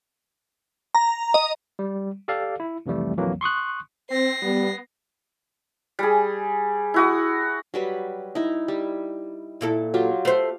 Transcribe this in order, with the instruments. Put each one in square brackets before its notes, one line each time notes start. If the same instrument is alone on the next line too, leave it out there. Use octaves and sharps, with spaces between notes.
[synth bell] A#5
D#5
[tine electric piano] G3
G4 A4 D5 F5
E4
C2 F2 E3 G3 A3
B1 F2 E3 F#3 A#3
C6 C#6 D#6 F#6
[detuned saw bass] C4 [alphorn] C5 [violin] A#6 C7
[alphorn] G3 [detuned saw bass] B3
[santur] G3 G#4
E4 F#4 D#6
[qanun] F#3 G3 B4
D#4 E4
G3
[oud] A#2 E4 A4
[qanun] F#3 F4 G4
[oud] A3 C5 [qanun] F5